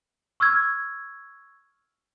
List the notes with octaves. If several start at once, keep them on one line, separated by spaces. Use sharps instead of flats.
C#6 E6 F6 G#6